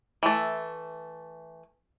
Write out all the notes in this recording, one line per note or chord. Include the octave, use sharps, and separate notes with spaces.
E3 A3